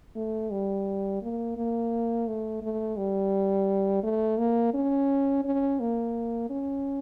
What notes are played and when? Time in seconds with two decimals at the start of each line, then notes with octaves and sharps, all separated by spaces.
0.16 A3
0.51 G3
1.22 A#3
1.57 A#3
2.28 A3
2.62 A3
2.97 G3
4.03 A3
4.38 A#3
4.74 C#4
5.45 C#4
5.80 A#3
6.50 C#4